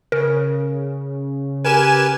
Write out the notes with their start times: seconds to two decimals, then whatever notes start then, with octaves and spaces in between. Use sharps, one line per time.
0.12 C#3 A#4
1.65 G4 A#4 B4 G#5 E7